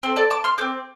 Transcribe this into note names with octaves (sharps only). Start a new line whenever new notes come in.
C4 A4 C5
A4 D5
A5 D6
C6 F6
C4 A4 D6 G6